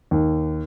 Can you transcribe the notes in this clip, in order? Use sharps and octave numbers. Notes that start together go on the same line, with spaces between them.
D#2